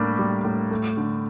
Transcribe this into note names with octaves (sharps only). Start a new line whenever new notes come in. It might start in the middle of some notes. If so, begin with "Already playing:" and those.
Already playing: A2 G3 A#3 D4
G3
A2
A3
D3